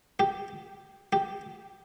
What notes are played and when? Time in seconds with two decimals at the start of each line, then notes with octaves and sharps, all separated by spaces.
0.20 G4
1.13 G4